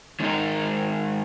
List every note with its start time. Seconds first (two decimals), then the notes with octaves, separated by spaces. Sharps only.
0.20 D#3 G#3 C4 D#4 A#4